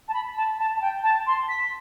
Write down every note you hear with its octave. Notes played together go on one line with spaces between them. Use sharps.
A5
B5
A5
A5
A5
G5
A5
C6
B6